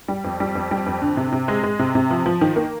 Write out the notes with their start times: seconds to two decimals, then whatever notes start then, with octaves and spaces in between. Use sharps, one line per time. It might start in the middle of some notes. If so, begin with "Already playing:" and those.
0.08 G3
0.24 F2
0.40 G3
0.55 F2
0.71 G3
0.86 F2
1.02 D3
1.17 C3
1.32 C3
1.48 G#3
1.63 G#3
1.79 C3
1.95 C3
2.11 F3
2.26 F3
2.41 D#3
2.56 A#3